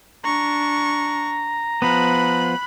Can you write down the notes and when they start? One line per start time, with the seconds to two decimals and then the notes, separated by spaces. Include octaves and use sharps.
0.25 D4 A#5 C#6
1.82 F3 B3 B5 F#6